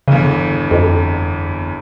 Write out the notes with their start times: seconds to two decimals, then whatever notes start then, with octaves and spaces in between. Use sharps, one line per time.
0.08 G1 E2 C#3
0.71 F2